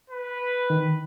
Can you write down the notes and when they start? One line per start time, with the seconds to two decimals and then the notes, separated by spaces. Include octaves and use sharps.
0.10 B4
0.70 D#3